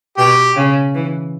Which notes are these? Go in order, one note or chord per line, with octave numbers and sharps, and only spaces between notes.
B2 G4
C#3
E3